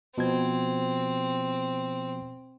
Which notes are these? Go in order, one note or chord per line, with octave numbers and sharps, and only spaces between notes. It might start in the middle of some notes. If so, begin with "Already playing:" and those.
B2 F3 C4 G#6